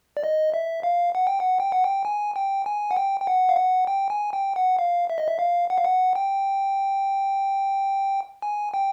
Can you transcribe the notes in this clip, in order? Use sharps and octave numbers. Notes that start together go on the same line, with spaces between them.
D5
D#5
E5
F5
F#5
G5
F#5
G5
F#5
G5
G#5
G5
G#5
F#5
G5
G5
F#5
F5
F#5
G5
G#5
G5
F#5
F5
E5
D#5
E5
F5
F#5
F5
F#5
G5
G#5
G5